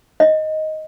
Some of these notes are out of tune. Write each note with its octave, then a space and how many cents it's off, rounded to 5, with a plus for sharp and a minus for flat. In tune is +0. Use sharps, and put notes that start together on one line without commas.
D#5 +5